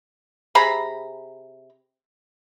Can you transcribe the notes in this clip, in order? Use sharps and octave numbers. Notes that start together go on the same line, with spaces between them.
C3 G#4 A#5 B5